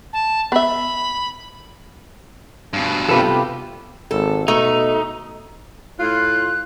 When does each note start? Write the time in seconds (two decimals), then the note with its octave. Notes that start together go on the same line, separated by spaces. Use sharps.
0.13 A5
0.52 B3 E5 B5
2.73 G2 B2
3.09 C3 B3 F4 G4 A4 B4
4.11 G#1 A4
4.48 B2 A3 D#4
5.99 A2 F4 F#6